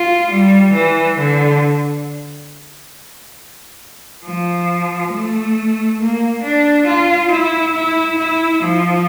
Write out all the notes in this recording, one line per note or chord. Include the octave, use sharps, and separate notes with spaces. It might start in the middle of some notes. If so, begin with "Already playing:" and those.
Already playing: F4
G3
E3
D3
F3
A3
A#3
D4
F4
E4
E4
E4
F3